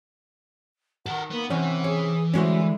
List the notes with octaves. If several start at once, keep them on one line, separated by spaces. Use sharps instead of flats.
D#3 A4 A#4 F#5
A#3 B3
C3 E3 C4 C#4 F#5
G#4 C#5
D3 G#3 C#4 E4 F#4 C5